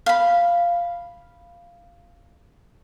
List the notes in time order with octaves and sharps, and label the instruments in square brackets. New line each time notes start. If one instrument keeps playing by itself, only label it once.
[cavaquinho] F5 B5